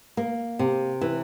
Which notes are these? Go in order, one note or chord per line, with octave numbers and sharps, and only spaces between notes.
A#3
C3
E3